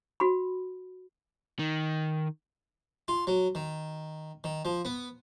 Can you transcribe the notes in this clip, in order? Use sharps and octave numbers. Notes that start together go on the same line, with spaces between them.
F#4 B5
D#3
F4
F#3
D#3
D#3
F3
B3